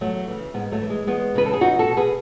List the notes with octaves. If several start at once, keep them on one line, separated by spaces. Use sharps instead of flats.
E2 F#3 A3
C#3 E3
G#2 G#3 B3
F#3 A3
E3
G#3
E2 G#3 B3
C#3 E3 B4
A4
G#4
E2 D#4 F#4
F#4 A4
B2
G#4 B4